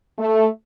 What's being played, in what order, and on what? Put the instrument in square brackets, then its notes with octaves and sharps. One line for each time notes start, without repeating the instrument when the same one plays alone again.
[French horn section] A3